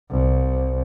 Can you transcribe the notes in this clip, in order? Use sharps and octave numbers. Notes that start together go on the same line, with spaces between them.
C2